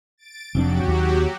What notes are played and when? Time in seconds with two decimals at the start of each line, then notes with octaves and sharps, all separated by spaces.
0.18 A6 D7
0.55 F1 F2 F#3 D4 F#4 G4
0.84 D1 D#2